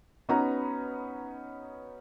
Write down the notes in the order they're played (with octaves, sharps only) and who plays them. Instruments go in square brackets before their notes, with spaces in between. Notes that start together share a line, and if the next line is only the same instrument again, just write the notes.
[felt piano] B3 C#4 D#4 F#4 B4 A#5